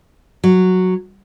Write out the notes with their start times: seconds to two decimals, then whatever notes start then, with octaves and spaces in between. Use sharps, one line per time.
0.44 F#3